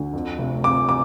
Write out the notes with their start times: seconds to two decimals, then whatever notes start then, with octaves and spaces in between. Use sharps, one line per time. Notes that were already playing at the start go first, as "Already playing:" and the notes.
Already playing: D2 D3
0.13 F2
0.39 F1
0.64 F2 D6
0.89 D6